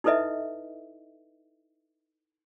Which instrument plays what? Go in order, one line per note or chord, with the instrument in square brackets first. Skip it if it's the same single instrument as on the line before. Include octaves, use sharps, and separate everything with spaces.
[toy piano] D#4 E4 A4 B4 D#5 E5